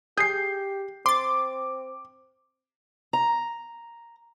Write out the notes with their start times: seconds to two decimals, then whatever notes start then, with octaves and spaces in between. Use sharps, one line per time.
0.18 G4 G#4 G6 C7
1.06 C4 C6 D6 A6
3.13 A#5